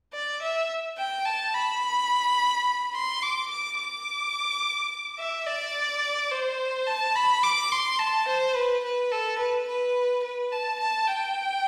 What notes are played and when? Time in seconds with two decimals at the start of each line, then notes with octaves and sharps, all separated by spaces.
0.14 D5
0.42 E5
0.98 G5
1.26 A5
1.55 B5
2.94 C6
3.22 D6
3.50 D6
3.79 D6
5.19 E5
5.47 D5
6.32 C5
6.87 A5
7.16 B5
7.43 D6
7.72 C6
7.99 A5
8.28 C5
8.56 B4
8.84 B4
9.12 A4
9.39 B4
9.68 B4
10.24 B4
10.52 A5
10.80 A5
11.07 G5